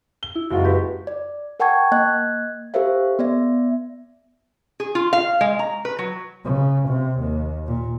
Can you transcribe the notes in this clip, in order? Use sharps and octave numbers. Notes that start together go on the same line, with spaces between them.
G7
E4
F#1 G#3 F4 F#4
G4 B4
D5
A#4 F#5 G5 A5 C#6 G#6
A#3 D#5 F#6 G#6
G4 A4 A#4 C5 E5 F5
B3 D5 E5
G#4
F4
F5
G#3
A#5
B4
F#3
C#3
C3
D#2
A#2